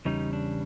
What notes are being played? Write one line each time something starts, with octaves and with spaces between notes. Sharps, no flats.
E2 C#3 G3 D#4
D4